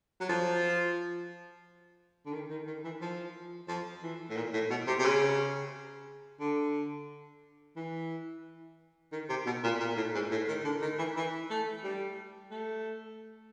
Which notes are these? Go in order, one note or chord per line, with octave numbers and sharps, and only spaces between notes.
F#3
F3
D3
D#3
D#3
D#3
E3
F3
F3
E3
A2
A#2
A2
B2
C3
C3
C#3
D3
E3
D#3
C3
B2
A#2
A#2
A2
G#2
A2
D#3
D3
D#3
E3
E3
A3
G3
A3